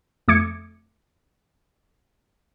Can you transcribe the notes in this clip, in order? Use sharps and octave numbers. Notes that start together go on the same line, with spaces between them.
F2 A3 D6 G#6 C#7